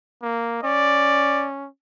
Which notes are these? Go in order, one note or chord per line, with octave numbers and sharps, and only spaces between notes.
A#3
C#4 D5